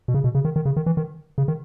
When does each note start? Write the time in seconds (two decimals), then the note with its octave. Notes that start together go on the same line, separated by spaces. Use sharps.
0.08 B2
0.14 C#3
0.24 B2
0.35 C#3
0.45 D#3
0.56 D#3
0.65 C#3
0.76 D#3
0.86 E3
0.97 D#3
1.38 C#3
1.48 D#3